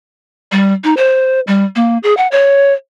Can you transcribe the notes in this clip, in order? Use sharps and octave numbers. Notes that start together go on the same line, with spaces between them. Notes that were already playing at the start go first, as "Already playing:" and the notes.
G3
D#4
C5
G3
A#3
G#4
F#5
C#5